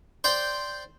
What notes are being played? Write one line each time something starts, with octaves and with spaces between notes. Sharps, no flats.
C5 D5 G5